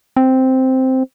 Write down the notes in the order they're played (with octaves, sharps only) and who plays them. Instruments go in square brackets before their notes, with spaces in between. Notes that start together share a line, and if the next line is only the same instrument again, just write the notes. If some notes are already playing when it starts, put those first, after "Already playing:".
[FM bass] C4